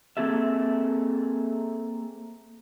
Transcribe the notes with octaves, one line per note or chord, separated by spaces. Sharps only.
A#3 C4 G#4 A4 E5